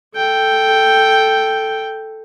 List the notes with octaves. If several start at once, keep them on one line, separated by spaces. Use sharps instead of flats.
A4 G5